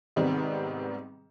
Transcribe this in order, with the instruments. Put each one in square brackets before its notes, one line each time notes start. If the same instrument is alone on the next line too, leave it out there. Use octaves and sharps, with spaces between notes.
[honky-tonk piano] G#2 C3 D#3 G3 B3 C4